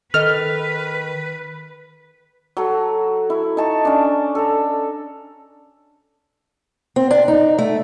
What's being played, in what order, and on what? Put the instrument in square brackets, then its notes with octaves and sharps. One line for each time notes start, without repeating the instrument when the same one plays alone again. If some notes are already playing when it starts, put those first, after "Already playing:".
[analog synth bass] D#3 [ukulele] A4 D#5 [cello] B4 [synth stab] F6
[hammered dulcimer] F#3 A4
E4
D#4 A5 C#6
C#4 D4
A4 A#5
[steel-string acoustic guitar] C4
D4
D#4
A3